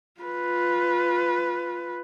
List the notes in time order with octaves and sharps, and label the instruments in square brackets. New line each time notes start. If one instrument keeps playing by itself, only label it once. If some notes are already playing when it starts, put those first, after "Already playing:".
[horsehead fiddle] F4 B4